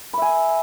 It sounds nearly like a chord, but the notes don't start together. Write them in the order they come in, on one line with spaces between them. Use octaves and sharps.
B5 E5 G#5